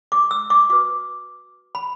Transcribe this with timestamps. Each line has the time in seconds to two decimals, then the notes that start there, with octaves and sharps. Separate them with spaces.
0.12 D6
0.31 E6
0.50 D6
0.70 F#4 B4 D6
1.75 B5